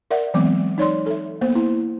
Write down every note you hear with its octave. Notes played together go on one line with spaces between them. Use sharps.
A#4 D5 E5 F#5
E3 F#3 G#3 B3 C4 D6
D#4 C#5 D5 C6
A4 E5
A#3 B3 C5
E4